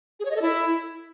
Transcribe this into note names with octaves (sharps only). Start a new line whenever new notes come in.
G#4
C#5
D#5
A4
E4